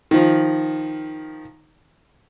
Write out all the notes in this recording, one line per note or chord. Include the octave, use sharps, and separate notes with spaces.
D#3 F3